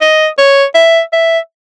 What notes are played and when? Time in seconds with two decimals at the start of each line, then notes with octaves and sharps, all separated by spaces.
0.01 D#5
0.38 C#5
0.75 E5
1.13 E5